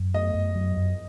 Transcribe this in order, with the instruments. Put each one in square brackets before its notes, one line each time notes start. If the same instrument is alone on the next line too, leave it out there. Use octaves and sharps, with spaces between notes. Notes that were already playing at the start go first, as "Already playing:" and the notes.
Already playing: [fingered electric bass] F#2
[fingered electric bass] A3 [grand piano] D#5
[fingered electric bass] F#2
F#3
F#2